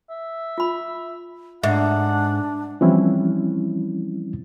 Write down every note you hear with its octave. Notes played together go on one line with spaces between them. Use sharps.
E5
F4 B5
G#2 D4 E5 F#5
E3 F3 G3 C4 C#4 E4